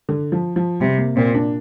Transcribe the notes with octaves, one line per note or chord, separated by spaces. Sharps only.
D3
F3
F3
C3 G3
A#3
A#2 C4
D4